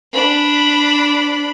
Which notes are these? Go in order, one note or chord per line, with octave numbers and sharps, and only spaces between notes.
D4 B5